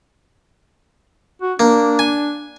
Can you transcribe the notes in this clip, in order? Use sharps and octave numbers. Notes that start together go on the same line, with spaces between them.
F#4
A#3 D4
G#5